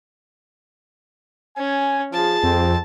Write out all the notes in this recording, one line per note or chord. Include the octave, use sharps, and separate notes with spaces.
C#4 G#5
F3 F4 G#4 A5
F2 C4